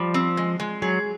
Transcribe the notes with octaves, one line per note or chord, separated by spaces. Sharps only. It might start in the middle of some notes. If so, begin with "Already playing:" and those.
Already playing: F3 G3
C4
G#3
G#3
F#3 G#4